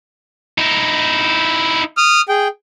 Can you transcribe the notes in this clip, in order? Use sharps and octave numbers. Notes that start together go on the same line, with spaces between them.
D#4 E4
D#6 F6
G#4 G5